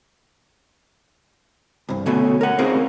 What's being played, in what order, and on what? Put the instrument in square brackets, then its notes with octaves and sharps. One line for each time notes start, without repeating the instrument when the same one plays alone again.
[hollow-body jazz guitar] C2 G2
D2 B2 A3 C#4
A#4 F#5
C4 C#4 F4 G#4 A#4